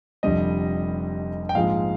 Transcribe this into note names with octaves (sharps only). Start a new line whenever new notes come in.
F1 F2 D3 G3 D#5
G5
A#1 G#2 F3 G#3 F5